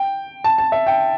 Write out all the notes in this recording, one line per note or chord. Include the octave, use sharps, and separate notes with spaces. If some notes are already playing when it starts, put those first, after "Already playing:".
Already playing: G5
A5
A5
E5
G5